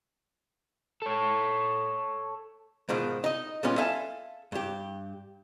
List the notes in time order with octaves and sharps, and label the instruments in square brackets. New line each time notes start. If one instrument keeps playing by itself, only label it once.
[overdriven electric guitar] A4 C#5
[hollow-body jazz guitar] G#2 B2 D#3 F3
D#4 D#5
A#2 G3 B3 C#4 F4
A4 E5 F5 G#5
G2 G4